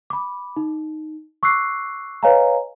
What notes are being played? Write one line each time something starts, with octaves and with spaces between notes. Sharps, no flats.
B5 D6
D#4
C#6 D6 E6 F#6 C7
B4 C#5 D#5 F5 G#5 A#5